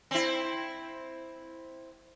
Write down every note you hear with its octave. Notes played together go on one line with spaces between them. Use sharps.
C4 E4